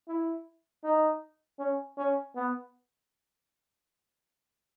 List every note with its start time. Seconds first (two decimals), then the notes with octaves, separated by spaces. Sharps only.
0.08 E4
0.84 D#4
1.59 C#4
1.98 C#4
2.36 B3